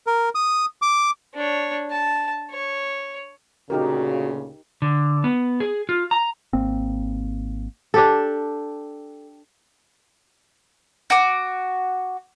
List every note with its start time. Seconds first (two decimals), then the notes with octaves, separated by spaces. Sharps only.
0.07 A#4
0.35 D#6
0.82 D6
1.35 D4 C#5
1.91 A5
2.51 C#5
3.70 D2 A#2 C#3 D#4 F#4 G4 A#4
4.82 D3
5.24 B3
5.60 G#4
5.89 F4
6.11 A#5
6.53 G#1 A#3 C4
7.94 D4 G4 A4
11.10 F#4 D6